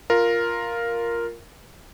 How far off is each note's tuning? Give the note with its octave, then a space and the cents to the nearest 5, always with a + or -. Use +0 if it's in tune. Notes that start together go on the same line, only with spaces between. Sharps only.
F4 +0 A#4 +0